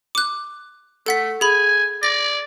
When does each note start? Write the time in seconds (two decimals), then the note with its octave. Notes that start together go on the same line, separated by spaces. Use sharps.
0.15 D6 F#6
1.06 A3 A4 F#5 B6
1.41 G#4 G#5 B5
2.03 D5 A#6